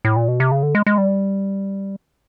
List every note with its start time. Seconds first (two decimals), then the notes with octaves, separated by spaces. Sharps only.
0.05 A2
0.16 A#2
0.28 B2
0.40 C3
0.52 C#3
0.63 D3
0.75 G#3
0.86 G#3
0.98 G3